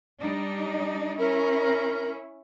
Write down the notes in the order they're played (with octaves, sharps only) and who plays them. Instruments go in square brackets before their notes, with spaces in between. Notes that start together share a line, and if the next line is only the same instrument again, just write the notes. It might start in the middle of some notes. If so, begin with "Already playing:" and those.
[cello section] G3 D4 D#4
[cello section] C#4 E4 [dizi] A#4